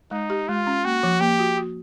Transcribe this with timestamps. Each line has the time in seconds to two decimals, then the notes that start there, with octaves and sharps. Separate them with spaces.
0.11 G#3 D#4
0.30 G4
0.48 G#3 F4
0.67 C#4
0.85 A#3 F#4
1.03 F3
1.20 A#3 G4
1.39 F#4
1.57 F#4